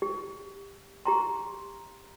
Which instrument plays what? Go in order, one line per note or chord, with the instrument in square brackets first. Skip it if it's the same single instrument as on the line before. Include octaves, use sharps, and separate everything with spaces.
[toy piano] G4
G4 A#5 C6